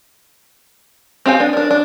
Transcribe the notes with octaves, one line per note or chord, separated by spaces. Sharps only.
C4 G4 F5 G#5
B3 D4
D4 A#4
D4